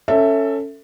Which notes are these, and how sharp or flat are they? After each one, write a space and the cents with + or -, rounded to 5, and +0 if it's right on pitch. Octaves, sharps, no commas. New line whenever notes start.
C#4 +0 A4 +20 E5 +0